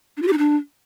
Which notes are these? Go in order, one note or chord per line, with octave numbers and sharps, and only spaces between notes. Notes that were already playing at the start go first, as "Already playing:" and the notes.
D4
F4
G4
D#4
D4